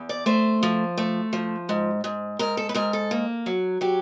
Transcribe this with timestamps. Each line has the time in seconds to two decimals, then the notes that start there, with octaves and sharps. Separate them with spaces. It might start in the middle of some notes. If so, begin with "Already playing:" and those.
Already playing: E2
0.09 D5
0.26 A3 C5
0.63 F3
0.98 A3
1.33 F3
1.69 G#2
2.04 G#2
2.39 G#2 A#4
2.57 A4
2.69 B4
2.74 G#2 A#4
2.93 A4
3.11 A#3
3.46 F#3
3.81 F#3 G4